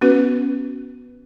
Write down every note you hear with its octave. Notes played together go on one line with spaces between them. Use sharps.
B3 C#4 F#4 B4